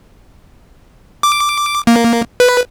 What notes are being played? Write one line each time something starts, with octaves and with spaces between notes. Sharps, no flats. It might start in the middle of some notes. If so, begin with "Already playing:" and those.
D6
A#3
B4